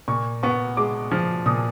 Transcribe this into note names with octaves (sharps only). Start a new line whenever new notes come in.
A#2 C#6
B3 C#6
G#3 D6
F3
A#2 D#6